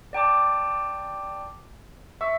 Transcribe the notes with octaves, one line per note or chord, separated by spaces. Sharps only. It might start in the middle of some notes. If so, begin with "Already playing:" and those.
D5 G5 A5 D6
E5 C#6 E6